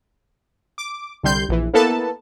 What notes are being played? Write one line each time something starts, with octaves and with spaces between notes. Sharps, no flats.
D6
C2 D3 G3 C6 G6
A#1 E3
A#3 B3 E4 A4 B4 A5